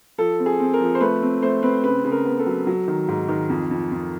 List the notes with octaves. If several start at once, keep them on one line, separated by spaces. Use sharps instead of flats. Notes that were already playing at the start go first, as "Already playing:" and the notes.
F3 A4
C4
G#4
C4
A#4
F3
C5
A3 B4
C4
A3 C5
C4 B4
C#3 B4
C#3
A#4
B3
A4
F#3
F#3
D#3
G#2
D#3
F2
F2
F2